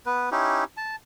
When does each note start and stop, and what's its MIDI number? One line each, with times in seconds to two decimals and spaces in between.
0.06 0.29 59
0.06 0.29 71
0.31 0.64 61
0.31 0.64 63
0.31 0.64 64
0.31 0.64 67
0.77 0.96 81